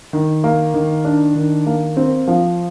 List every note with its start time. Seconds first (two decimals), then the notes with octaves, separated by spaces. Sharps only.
0.13 D#3
0.44 A#3
0.74 D#3
1.05 D4
1.35 D#3
1.66 A#3
1.97 C4
2.27 F3